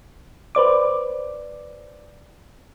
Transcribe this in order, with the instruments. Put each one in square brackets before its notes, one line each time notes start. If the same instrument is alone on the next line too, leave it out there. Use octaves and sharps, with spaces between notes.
[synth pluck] B4 C5 D5 D6